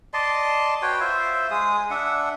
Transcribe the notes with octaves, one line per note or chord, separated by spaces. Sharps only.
D5 D#5 A5 C6
F#4 B4 C#5 G5
F4 C5 E5
G#3 G#4 D#6
D4 E5 F#5